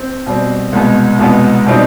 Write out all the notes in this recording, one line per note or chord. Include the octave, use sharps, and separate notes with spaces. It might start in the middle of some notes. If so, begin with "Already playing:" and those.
Already playing: C4
B2 G3 C4
C2 B2 G#3 B3
C2 B2 G#3 B3
B2 G3 C4 D#4